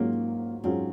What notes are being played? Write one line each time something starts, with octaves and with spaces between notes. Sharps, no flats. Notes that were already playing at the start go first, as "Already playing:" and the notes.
Already playing: G#2 F#3 A#3 C#4 F4 G#4
G#2 F#3 C4 C#4 F4 G#4